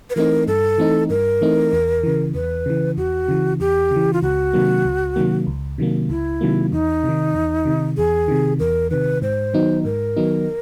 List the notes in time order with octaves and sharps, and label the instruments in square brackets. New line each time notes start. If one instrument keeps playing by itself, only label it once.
[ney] B4
[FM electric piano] E3 A3 C4 D#4 [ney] A#4
[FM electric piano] G2 [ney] A4
[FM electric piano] E3 A3 C4 D#4
[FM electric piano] G2 [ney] A#4
[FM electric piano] E3 A3 C4 D#4
E2
C#3 E3
[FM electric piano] E2 [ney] B4
[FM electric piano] C#3 E3
[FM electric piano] E2 [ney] F#4
[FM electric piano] C#3 E3
[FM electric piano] E2 [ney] G4
[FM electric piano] C#3
E3
[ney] F4
[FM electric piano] C#2 [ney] F#4
[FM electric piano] C3 D#3 F#3 A#3
C#2
C3 D#3 F#3 A#3
C#2
C3 D#3 F#3 A#3
[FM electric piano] C#2 [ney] E4
[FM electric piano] C3 D#3 F#3 A#3
[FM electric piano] E2 [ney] D#4
[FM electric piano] C3
D#3
E2
C3 D#3
[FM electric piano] E2 [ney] G#4
[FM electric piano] C3 D#3
[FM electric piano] E2 [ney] A#4
[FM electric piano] C3 D#3 [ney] B4
[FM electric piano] G#2 [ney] C5
[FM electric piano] D#3 F#3 B3 D#4
[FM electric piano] G#2 [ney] A#4
[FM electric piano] D#3 F#3 B3 D#4